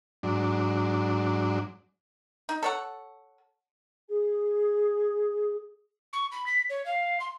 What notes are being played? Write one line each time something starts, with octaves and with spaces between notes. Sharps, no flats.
G#2 F#3 D4
D#4
A4 C#5 F#5
G#4
C#6
B5
B6
C#5
F5
C6